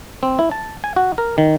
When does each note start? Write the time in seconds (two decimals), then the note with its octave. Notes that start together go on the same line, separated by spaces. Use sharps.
0.23 C4
0.39 E4
0.51 A5
0.84 G#5
0.96 F#4
1.18 A#4
1.38 D#3